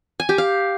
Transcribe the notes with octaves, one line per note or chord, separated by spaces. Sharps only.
G#5
G4
F5